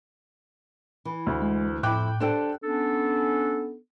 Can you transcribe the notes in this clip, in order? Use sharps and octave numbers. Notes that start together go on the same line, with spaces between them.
E3
D2
G#3
F2 A2 E4 G5 D6 F#6
D4 G4 A4 C5 G5
B3 C#4 D4 A4